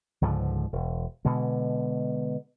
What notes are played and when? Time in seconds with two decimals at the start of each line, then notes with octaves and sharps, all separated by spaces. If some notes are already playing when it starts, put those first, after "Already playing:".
0.22 C#2 G#2 D3 F3
0.73 E1
1.25 B2 D3 G#3